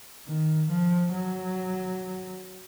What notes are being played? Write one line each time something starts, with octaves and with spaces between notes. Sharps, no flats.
D#3
F3
F#3